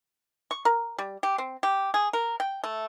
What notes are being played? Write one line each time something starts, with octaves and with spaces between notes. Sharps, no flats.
C#6
A#4
G3
G4
C4
G4
G#4
A#4
G5
A3